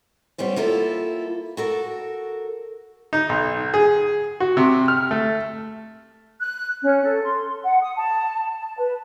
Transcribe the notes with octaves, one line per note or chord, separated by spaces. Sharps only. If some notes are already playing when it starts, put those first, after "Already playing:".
G3 B3 C#4 C5
A#3 E4 F4 A4
F#4 A4 A#4
D#4
B1
G#4
F#4
C3
F6
A3
F#6
C#4
A4
C6
F#5
D#6
A5
A5
B4